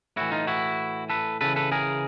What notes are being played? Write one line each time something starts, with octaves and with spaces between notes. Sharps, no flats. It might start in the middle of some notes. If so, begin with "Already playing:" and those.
A2 E3 E4 F#4
D#4 F4
E4 F#4
A4 B4
C#3 E3 A4 B4
A4 B4
G#4 A#4